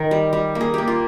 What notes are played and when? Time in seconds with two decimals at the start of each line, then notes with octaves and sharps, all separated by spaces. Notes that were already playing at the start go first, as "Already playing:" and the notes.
Already playing: D#3
0.11 G3
0.33 G3
0.55 A#3
0.61 G#4
0.74 A#3 G4
0.88 F4